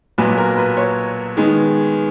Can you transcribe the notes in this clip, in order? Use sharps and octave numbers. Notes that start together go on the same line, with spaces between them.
B1 A#2 F#3 B3 B4
A#4
B4
C#5
D#3 G#3 B3